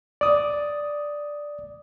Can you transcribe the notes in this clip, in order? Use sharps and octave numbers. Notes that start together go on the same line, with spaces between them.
D5 D#6